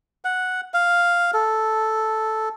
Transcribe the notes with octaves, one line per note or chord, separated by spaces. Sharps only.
F#5
F5
A4